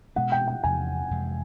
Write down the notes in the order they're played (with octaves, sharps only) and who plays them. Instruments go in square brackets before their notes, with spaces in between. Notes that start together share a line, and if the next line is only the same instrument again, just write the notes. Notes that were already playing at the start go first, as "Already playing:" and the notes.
[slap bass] B2 G#3 B3 D4 [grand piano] F#5
[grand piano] G5
G5
[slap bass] E2 C3 F3 [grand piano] G#5
[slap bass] F2 C3 E3 G#3